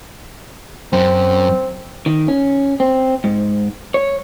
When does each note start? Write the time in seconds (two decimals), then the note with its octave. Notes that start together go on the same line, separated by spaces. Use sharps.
0.93 F#2 C4
2.06 D#3
2.28 C#4
2.80 C4
3.24 G#2
3.94 C#5